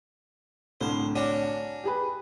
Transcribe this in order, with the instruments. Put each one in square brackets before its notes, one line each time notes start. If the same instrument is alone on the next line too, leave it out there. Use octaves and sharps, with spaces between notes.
[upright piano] C2 A2 D3 [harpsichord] C5
[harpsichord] C#4 D4 F#4
[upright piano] G4 G#4 B4